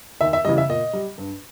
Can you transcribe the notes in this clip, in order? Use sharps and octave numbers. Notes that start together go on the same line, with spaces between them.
D#2 E5
E5
C#3 E3 G3 D#5
E5
A#2 D#5
G3
G2